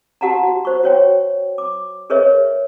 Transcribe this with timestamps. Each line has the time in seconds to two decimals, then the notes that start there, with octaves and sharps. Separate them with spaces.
0.21 F#4 G4 F#5 A5 A#5
0.43 F#4
0.65 C5 C#6
0.83 F#4 C#5 G5
1.58 D6
2.10 G#4 A#4 B4 C#5 D#5 E5